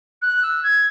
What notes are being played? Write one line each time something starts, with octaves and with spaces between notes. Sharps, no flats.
F#6
E6
G#6